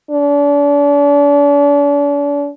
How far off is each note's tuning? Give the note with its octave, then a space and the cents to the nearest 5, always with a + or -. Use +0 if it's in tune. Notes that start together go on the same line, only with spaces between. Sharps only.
D4 -40